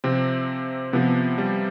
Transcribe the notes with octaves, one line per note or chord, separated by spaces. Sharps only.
C3 F3 C4
C3 F3 B3
G3